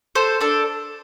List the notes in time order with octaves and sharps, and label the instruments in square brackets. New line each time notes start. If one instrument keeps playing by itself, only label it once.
[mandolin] A4 C5
D4 A4